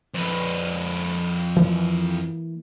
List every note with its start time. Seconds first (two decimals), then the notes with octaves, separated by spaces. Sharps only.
0.14 F2 B4
1.56 E3 G3 A#3